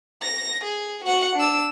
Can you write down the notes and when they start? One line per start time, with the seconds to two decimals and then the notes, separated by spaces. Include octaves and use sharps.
0.22 A#6
0.64 G#4
1.04 F#4 F#5
1.36 D4 E6